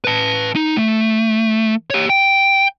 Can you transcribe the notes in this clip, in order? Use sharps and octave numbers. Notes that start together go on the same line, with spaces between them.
B4 A5
D#4
A3
G4 C#5
G5